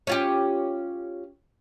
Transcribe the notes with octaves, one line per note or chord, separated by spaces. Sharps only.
C#4 F4 G4